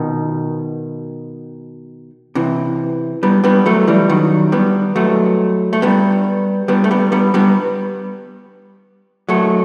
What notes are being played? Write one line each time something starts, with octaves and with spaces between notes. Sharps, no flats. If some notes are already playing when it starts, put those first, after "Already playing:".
Already playing: B2 D#3
C3 E3
G3 B3
G3 B3
F#3 A3
E3 G3
D#3 F#3
G3 B3
F#3 A3
A3
G3 B3
G3 B3
A3
G3 B3
G3 B3
G3 B3
F#3 A3